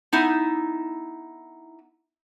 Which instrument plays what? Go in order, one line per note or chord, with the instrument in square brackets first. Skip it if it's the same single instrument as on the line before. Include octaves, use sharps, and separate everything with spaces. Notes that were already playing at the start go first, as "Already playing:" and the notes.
[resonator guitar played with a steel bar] B3 D#4 E4